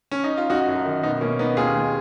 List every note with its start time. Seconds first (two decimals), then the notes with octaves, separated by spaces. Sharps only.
0.11 C#4
0.24 D#4
0.37 F4
0.50 F#2 D#4 F#4
0.68 F#2
0.85 D#3
1.03 B2 B3 D#4
1.21 B2 A#3 C#4
1.39 B2 B3 D#4
1.57 D#2 F4 G#4
1.75 D#2